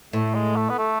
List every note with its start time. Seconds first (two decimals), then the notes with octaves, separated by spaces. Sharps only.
0.13 A2 A3
0.34 G#3
0.56 A3
0.70 B3
0.78 A3